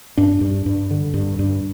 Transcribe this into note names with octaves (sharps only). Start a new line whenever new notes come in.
G2 D4
G2
G2
D3
G2
G2